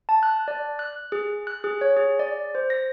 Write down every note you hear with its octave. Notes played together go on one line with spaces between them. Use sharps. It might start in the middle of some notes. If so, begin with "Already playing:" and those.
A5
F#6
D5
F#6
G#4
F#6
G#4
C#5
G#4
D5
C5
A#6